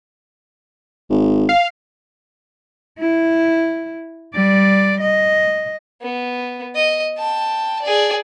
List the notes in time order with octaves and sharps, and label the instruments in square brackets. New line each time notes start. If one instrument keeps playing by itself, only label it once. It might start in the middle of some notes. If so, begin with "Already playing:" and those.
[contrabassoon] G#1
[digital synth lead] F5
[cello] E4
G3 D5
D#5
[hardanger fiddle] B3
D#5
G5 A5
G#4 D5